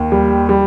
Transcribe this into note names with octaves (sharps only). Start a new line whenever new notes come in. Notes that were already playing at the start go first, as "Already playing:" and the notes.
Already playing: D#2
G3
G3